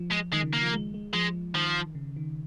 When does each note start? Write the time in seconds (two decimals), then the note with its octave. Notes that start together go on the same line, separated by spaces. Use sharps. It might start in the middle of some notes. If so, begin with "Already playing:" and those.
Already playing: F3
0.12 G#3
0.33 D#3 G#3
0.42 C#3
0.53 A#3
0.62 F3
0.73 G#3
0.94 G#3
1.13 F3 G#3
1.55 D#3 F3
1.95 C#3
2.16 D#3